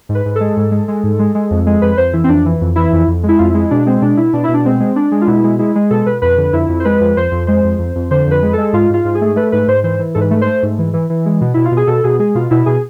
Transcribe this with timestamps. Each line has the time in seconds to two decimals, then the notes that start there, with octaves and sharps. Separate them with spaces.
0.09 G#2
0.15 B4
0.25 G#2
0.36 G#3 A4
0.57 G#2
0.71 G#3
0.88 G#3
1.04 G#2
1.19 G#3
1.35 G#3
1.51 F2
1.66 G#3
1.82 F2 B4
1.97 F2 C5
2.13 E3 E4
2.24 C4
2.29 F2 D4
2.45 E3
2.61 F2
2.76 E3 E4
2.93 F2
3.08 F2
3.23 G#3
3.29 E4
3.39 F2 F4
3.50 G#3 E4
3.71 B2 D4
3.86 G#3 C4
4.02 B2 D4
4.17 B2 E4
4.33 B2 D4
4.44 B2 E4
4.54 D4
4.65 G#3 C4
4.80 G#3
4.96 G#3 D4
5.11 G#3
5.21 F4
5.27 B2 E4
5.44 G#3
5.59 G#3 E4
5.75 G#3
5.90 B2 A4
6.06 B2 B4
6.22 F2 B4
6.37 D3
6.53 F2 E4
6.69 F2
6.80 C5
6.85 G#3 B4
7.01 F2
7.17 F2 C5
7.31 F2
7.47 G#3 C5
7.64 F2
7.79 F2
7.96 F2
8.11 D3 C5
8.26 F2 B4
8.43 G#3
8.53 G#3 A4
8.73 G#2 F4
8.90 G#2 F4
9.05 G#2
9.15 G#4
9.21 A3
9.36 A3 B4
9.52 G#2 B4
9.68 G#2 C5
9.84 E3 C5
9.99 E3
10.15 G#2 A4
10.21 B4
10.31 A3
10.41 A3 C5
10.63 G#2
10.78 E3
10.94 E3
11.10 E3
11.26 G#3
11.41 B2
11.54 B2 E4
11.65 F4
11.72 B2
11.77 G#4
11.87 B2 A4
12.04 B2 G#4
12.19 G#3 G#4
12.35 B2 F4
12.51 B2 E4
12.66 B2 G#4